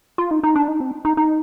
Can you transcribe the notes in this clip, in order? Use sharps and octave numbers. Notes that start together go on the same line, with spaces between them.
F4
D#4
D#4
D4
D#4
C4
D#4
D#4